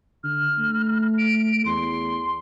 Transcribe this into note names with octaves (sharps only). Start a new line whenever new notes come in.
D3 F6
A3
D7
E2 C6